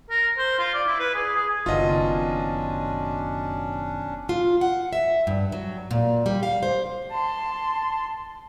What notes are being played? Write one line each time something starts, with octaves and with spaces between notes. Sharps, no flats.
A#4
C5
F4
D5
E4
B4
G#4
G#4
F#1 B2 D#3 F#3 C#4 D4 F4 D#5
F4
F#5
E5
G2
F#3
A#2
G3
F5
C5
A5 C6